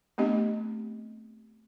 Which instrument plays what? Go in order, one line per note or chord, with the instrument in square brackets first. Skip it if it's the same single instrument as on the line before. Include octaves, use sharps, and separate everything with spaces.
[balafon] A3 B3 C4 D4 G4 D#5